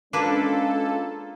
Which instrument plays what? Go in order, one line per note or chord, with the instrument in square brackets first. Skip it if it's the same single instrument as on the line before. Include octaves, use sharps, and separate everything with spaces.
[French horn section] G#3 C#4 F4 [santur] A#3 [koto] D4 B4 [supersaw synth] A4